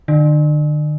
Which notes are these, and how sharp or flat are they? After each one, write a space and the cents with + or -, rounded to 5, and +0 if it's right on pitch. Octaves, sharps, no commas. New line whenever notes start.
D3 +40